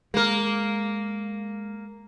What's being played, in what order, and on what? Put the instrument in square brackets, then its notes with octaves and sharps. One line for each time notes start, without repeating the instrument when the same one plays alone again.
[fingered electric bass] G#3 [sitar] A#3 A#4